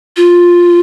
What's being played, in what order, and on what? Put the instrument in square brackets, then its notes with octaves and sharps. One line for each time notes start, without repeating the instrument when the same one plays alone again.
[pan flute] F4